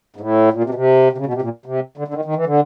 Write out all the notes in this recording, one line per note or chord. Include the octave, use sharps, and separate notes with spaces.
G#2
A2
A#2
C3
B2
C3
C3
C#3
B2
C3
A#2
C3
D3
D3
D#3
D#3
E3
D3